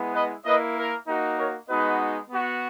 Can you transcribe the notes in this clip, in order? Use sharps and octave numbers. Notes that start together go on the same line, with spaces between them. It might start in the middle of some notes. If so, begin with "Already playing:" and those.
Already playing: G#3 B3 E4
B4 D#5
A#3 E4 B4 D#5
A#4
A#3 D#4 F#4
A#4 C#5
G#3 B3 D#4 F#4 B4 D#5
B3 F#4